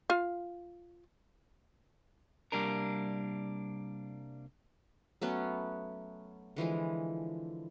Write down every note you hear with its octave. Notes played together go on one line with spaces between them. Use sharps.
F4 F5
C2 G3 A#3 D4 A#4
F#3 A3 B3 C#4
D3 E3 F3 G#3